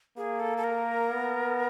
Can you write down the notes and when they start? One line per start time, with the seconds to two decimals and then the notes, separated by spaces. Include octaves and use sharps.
0.17 A#3 G#4
0.40 A4
0.57 A4
0.64 A#4
1.10 B3